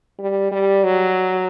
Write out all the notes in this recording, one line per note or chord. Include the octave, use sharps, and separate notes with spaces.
G3
G3
F#3